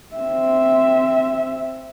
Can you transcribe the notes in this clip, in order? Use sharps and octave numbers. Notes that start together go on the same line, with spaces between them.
C4 E5